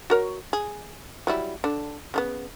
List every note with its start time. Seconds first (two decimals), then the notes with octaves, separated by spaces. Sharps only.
0.10 F#4 A#4 C#5
0.53 G#4
1.27 F#3 G3 E4
1.64 D3 D4
2.14 C#3 A3 B3